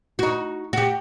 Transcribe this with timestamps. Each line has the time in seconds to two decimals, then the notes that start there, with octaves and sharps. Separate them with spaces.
0.19 D#4 F#4
0.73 F#4 G4